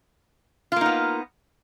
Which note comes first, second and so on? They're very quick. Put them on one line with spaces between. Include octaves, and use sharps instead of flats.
F4 A#3 D#4 B3